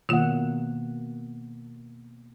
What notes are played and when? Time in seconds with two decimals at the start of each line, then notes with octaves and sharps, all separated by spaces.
0.09 B2 D#3 A#3 F4 F#5